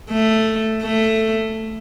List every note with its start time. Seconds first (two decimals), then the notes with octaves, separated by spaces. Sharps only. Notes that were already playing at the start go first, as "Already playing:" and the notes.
0.11 A3
0.83 A3